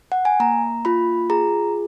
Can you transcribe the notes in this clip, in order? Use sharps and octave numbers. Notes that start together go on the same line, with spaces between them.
F#5
G#5
A#3 A#5
F4 B5
G#4 A#5